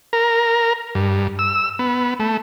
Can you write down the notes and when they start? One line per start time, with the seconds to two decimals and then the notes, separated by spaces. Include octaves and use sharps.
0.13 A#4
0.95 G2
1.39 E6
1.79 B3
2.20 A3